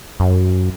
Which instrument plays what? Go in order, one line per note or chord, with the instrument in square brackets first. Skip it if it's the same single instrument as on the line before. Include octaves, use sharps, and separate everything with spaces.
[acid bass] F#2